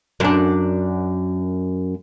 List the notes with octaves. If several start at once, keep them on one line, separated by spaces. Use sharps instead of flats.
F#2 D4